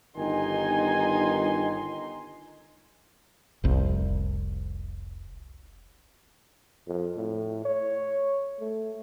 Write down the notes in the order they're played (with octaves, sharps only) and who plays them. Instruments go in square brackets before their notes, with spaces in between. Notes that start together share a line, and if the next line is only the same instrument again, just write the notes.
[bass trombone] G1 [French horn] D#3 [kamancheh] D#4 C6 [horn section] G#5
[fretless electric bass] F1 C2
[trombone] F2
A2
C#5
A3